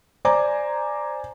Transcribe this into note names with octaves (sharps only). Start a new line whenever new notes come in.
C5 D5 G#5 A#5 D6